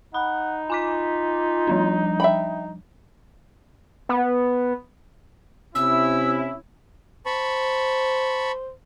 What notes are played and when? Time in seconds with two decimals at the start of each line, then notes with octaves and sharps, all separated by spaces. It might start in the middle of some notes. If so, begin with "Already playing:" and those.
0.14 D#4 F#5 B5
0.70 F4 G#5 D6 B6
1.67 F3 G3 D4
2.20 E5 G5 B5
4.09 B3
5.75 C3 C#4 E4 E6
7.26 C5 A5 B5 C#6